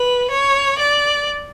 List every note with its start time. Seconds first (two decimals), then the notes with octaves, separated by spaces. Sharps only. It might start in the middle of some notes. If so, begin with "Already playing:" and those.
Already playing: B4
0.30 C#5
0.78 D5